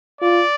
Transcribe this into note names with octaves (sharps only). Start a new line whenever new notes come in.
F4 D5